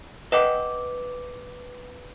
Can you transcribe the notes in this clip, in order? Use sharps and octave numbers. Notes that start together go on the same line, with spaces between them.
B4 D#5 F#5 G5 D6